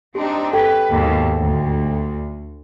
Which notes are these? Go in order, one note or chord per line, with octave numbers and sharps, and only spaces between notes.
C4 D4 D#4 G4
G4 A4 B4 G5
D#2 G#2 B2
D2